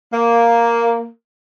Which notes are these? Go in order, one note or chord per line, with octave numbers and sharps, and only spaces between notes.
A#3